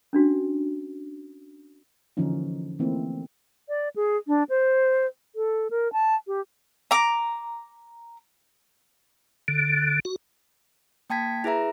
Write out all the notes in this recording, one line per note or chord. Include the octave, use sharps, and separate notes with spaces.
C#4 D4 F#4
D3 E3 F3 A#3 C#4 D#4
E3 A3 A#3 C4 D#4 E4
D5
G#4
D4
C5
A4
A#4
A5
G4
A#5 D6
D3
F#4
A#3 G5 A5 G#6 B6
E4 G#4 B4 E5 A#5